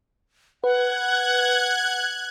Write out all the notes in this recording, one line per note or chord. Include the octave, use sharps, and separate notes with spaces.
B4 F#5 F#6 G#6